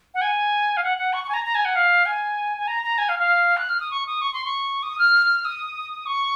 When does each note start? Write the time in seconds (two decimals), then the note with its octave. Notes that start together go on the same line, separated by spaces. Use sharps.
0.14 F#5
0.21 G#5
0.77 F5
0.83 F#5
0.98 F#5
1.13 C#6
1.24 C#6
1.29 G#5
1.34 A#5
1.45 A#5
1.55 G#5
1.65 F#5
1.76 F5
2.06 G#5
2.58 G#5
2.67 A#5
2.83 A#5
2.98 G#5
3.09 F5
3.19 F5
3.57 F#6
3.69 F6
3.80 D#6
3.91 C#6
4.07 D#6
4.21 C#6
4.33 C6
4.45 C#6
4.83 D#6
4.99 F6
5.45 D#6
6.06 C#6